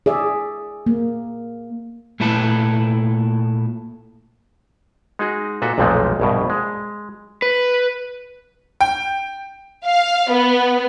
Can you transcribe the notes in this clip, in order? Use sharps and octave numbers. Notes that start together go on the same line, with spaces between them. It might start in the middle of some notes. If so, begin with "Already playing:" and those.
G#4 D5 E5
A#3
A#2 A3 E4 A4 B4
G#3 D#4 F#4 G#4
A#2 F#4 A4 B4 E5
B1 F2 A#2 F3 G#3 A3
A#1 G2 B2
G#3
B4
G5
F5
B3